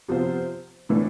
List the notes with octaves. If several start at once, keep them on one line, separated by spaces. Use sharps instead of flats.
C3 F3 B3 F4 C5
A2 E3 A3 D4